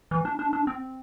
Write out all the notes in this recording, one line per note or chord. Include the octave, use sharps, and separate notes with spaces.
E3
D4
D4
D4
C4